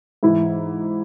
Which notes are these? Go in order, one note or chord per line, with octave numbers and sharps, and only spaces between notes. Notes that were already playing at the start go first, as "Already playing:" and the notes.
G#2 E3 E4